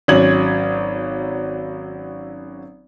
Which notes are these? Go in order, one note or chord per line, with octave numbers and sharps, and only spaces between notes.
G#1 F#3 C#4 G#6 F#7